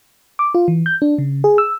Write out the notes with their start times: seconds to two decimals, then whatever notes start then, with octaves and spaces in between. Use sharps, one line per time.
0.39 D6
0.55 F4
0.68 E3
0.86 G6
1.02 D4
1.18 C#3
1.44 G#4
1.58 E6